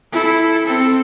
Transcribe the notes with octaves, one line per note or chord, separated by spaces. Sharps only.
E4 A4
C4 A4